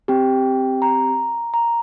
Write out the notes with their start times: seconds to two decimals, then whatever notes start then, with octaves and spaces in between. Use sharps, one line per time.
0.08 C4 G4 G5
0.82 A#5
1.54 A#5